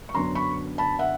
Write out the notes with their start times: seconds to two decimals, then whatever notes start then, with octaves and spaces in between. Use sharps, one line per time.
0.09 C#6
0.15 F#2 D3 F#3 B3 D4 A#5 C6
0.35 B5 C#6
0.78 A5 B5
0.99 E5 F#5